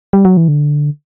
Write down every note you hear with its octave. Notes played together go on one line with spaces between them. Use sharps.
G3
F#3
E3
D3